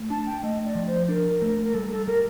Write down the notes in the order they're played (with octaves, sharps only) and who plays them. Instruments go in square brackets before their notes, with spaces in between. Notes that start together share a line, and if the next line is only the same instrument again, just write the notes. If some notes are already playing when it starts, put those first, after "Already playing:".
Already playing: [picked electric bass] A3
[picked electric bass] D4 [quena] A5
[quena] G5
[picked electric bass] A3 [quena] D#5
[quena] D5
[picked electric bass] F3
[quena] C5
[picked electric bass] D4 [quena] A#4
[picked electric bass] A3
[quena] A#4
[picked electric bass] G3 [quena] A4
[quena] A4
[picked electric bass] G3 [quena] A#4